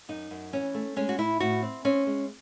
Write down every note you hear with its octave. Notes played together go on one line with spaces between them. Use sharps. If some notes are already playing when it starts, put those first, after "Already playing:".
F#2 D#4
F#2
E3 C#4
A3
G#3 C#4
F#4
A2 E4
A2 F#4
C4
C4 C#4
G#3